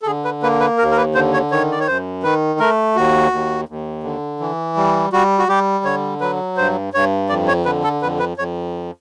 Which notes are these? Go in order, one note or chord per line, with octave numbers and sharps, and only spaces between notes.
A4
D3 G#4
B4
A#3 B4
B4
D#2 A#4
A#4
B4
D3 C5
C#5
D#3 C#5
D5
C#5
F#2 C5
D#3 B4
A3 A#4
D#2 F#4
D#2
D#2
D3
E3
G3
G3 F#4
F#4
G3 G4
D3 C#5
F#3 B4
G2 C5
G2 C#5
F2 D5
C#5
D3 B4
A4
F2 B4
B4
F2 C#5